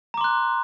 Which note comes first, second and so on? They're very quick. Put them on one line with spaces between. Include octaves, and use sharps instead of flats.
A#5 D6 C6 F#6